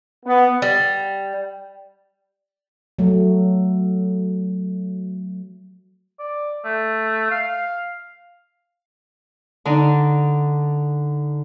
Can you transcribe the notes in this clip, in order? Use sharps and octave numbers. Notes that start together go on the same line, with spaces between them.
B3
G3
F#3 A3
D5
A3
F5
D3 D4 D#4